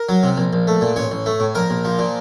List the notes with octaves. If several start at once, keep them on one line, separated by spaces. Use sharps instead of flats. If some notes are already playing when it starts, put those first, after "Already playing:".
Already playing: A#4
F#3
C3
A#1
A#1
A3
A#2
A1 C#5
A1
A3
A2
A#1 A#4
A#1
F3
A#2